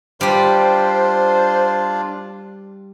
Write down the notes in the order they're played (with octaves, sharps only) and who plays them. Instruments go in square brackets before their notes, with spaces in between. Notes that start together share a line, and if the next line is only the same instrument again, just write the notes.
[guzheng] G3 G4 [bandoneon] D4 F4 [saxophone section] C5